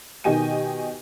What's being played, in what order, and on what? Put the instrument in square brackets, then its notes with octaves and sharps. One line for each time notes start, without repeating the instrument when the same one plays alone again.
[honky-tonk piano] B2 D#3 G4 D#5 G#5 D#7